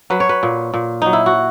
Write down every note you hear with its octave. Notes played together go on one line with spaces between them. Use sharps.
F#3 B4
C#5
B4
A#2
A#2
F#3 D#4
E4
F#4